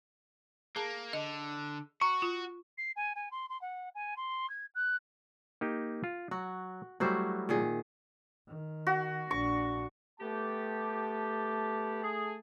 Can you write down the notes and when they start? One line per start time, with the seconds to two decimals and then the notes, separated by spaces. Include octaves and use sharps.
0.76 A#3 G#4 A5
1.13 D3 D#5
2.02 F#4 A#5 C#6
2.22 F4
2.78 C7
2.96 G#5
3.15 G#5
3.31 C6
3.49 C6
3.61 F#5
3.95 G#5
4.17 C6
4.50 G#6
4.75 F#6
5.61 A#3 D#4 G4
6.04 F4
6.31 F#3 F#4
7.00 F#3 G3 A3 E4 F#4 C5
7.49 A#2 D#3 G#4
8.48 D#3
8.87 F#4
9.31 A#1 D4 C#6
10.20 A3 B3 G4 A5
12.03 G#4